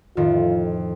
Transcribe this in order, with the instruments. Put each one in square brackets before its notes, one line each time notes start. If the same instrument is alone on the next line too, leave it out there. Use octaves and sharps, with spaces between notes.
[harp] F2 A2 D#3 [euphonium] F4